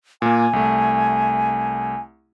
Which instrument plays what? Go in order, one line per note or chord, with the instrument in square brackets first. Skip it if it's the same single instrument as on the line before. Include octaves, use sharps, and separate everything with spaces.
[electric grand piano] A#2 A#3 [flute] G#5
[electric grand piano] C2 A3